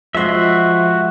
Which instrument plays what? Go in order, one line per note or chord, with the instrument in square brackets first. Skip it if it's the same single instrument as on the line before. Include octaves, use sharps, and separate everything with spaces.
[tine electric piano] F3 G#3 C6 [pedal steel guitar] F#4 E5